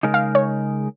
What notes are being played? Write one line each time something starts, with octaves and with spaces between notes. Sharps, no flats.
C#3 G#3 D#4 A#4
F5
C#5